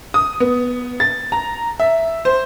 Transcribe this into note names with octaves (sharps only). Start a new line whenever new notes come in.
D#6
B3
A6
A#5
E5
C5